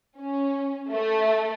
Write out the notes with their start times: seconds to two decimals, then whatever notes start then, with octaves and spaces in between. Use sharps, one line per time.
0.17 C#4
0.93 A3